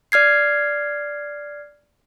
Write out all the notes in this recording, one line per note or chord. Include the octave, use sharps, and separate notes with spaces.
D5 F6 G#6 C7